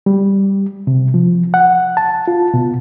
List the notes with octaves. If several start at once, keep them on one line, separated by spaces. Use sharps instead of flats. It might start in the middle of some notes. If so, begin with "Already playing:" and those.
G3
C3
F3
F#5
A5
F4
B2